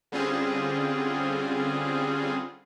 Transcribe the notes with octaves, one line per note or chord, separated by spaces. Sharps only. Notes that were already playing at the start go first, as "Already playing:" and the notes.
D3 G3 C4 C#4 F4 G#4